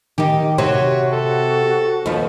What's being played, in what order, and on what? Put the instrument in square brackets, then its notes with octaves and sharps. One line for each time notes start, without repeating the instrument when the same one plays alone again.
[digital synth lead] D#3 [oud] D#4 G4
[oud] C3 C4 [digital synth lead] F#4 [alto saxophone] C#5
[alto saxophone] A4
[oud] D#2 B3 [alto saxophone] F3